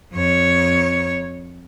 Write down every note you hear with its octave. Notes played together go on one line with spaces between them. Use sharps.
F2 C#5